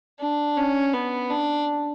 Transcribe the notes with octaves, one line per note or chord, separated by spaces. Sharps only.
D4
C#4
B3
D4